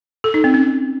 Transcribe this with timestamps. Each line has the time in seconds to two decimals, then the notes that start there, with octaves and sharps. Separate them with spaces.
0.24 A4
0.34 D#4
0.44 C4
0.54 C#4